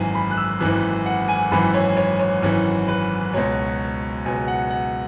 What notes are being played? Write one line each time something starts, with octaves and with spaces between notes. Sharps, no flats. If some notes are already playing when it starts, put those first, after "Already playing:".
Already playing: G#1 F#2 E3 G#5
B5
F#6
E6
G#1 F#2 E3 F#6
F#5
G#5
G#1 F#2 E3 B5
C#5
C#5
C#5
G#1 F#2 E3 C#5
B4
C#2 B2 F#3 C#5
C#2 B2 F#3 G#5
F#5
F#5